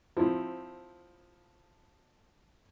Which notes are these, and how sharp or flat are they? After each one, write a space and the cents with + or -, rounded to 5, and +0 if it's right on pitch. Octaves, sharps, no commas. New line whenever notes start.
F3 +10 C4 +0 E4 +0